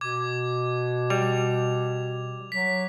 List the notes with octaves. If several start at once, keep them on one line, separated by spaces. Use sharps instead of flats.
B2 D6 G#6
G3 F7
F#3 B6